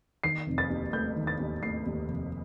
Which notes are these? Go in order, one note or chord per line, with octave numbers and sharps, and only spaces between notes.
D#3 C7
F1
A6
D#2
A3 G6
D#3
A6
D#2
A3 C7
D#2
F1